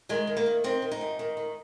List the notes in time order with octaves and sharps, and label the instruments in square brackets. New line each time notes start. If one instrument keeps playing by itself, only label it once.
[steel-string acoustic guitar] D#3 G#3
D#3
A#3
D#3
D#3 C4
D#3
D#4
G#2
D#3
D#3